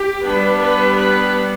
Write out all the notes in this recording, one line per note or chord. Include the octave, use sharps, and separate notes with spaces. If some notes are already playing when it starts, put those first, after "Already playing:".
Already playing: G4
G3 B3 D4 B4
B4
B4